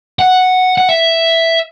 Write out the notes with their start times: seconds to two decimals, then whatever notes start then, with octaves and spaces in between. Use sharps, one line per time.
0.19 F#5
0.78 F#5
0.89 E5